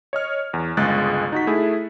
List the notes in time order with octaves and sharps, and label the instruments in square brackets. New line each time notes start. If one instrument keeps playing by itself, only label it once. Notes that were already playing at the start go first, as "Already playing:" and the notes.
[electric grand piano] C#5 D#5 F6
E2
G1 C#2 G#3 G#4 F#6 A6
D#4 F#4 B6
A3 E4 G#4